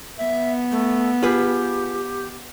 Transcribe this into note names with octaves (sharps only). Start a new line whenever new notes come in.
B3 E5
A3
F4 G4 G#4 B4